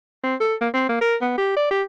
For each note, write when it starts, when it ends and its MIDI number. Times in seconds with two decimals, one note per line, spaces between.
0.23 0.35 60
0.40 0.54 69
0.61 0.68 58
0.74 0.84 60
0.89 0.97 58
1.01 1.16 70
1.21 1.34 59
1.37 1.53 67
1.57 1.68 74
1.71 1.82 67